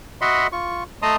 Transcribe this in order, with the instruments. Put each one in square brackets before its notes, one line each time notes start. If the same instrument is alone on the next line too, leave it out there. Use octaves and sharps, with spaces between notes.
[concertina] F#4 D#5 E5 F#5 B5 C6
F4 C#6
A3 D#5 A5 A#5 C6 D#6